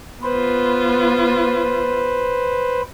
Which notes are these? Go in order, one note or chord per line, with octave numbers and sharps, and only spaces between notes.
B3 F4 B4 C5